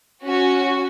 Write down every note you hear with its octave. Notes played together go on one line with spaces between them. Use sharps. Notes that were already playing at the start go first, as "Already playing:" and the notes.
C#4 F#4